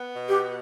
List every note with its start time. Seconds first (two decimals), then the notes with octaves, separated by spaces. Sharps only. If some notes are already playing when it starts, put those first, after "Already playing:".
Already playing: B3
0.16 B2
0.28 G4